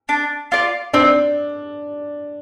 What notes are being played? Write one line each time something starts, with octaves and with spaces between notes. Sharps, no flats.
D4
F4 D5
C4 D4